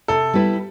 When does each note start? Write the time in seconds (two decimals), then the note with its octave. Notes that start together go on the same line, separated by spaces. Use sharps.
0.08 C3 A4
0.33 G3 B3 E4 B4